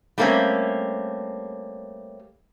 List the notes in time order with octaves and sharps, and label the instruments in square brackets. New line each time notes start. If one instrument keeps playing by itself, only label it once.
[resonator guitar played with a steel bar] G3 A3 A#3 C4 C#4